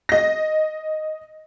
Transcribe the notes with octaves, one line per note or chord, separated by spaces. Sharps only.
D#5 A#6